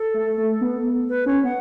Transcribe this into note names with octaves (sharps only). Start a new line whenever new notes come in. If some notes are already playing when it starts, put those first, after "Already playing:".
Already playing: A4
A3
A3
B3
B4
C#4 C#5
B3 F#5